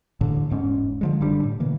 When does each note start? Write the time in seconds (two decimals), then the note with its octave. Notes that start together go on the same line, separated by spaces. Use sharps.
0.21 A1 A2 D3
0.50 E1 G#2 C#4
1.01 D3 F3 G#3
1.20 F#1 D3 G3 D4
1.43 A2
1.60 B2 D3 E3 A#3